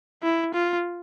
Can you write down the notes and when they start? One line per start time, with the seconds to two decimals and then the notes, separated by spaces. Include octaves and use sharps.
0.23 E4
0.54 F4